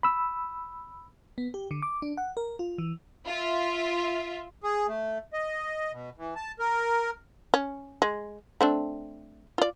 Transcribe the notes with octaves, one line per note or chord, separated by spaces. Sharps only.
B5 E6
B3
G4
D3
D6
D4
F#5
A#4
F4
E3
F4 E5
G#4
A3
D#5
B2
E3
A5
A#4
C#4
G#3
A3 C4 D4
F4 D5